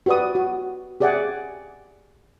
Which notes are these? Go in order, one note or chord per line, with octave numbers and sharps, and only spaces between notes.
F#4 G4 B4 D5 D#6
F#4
G4 G#4 D5 E5 F#5 G#5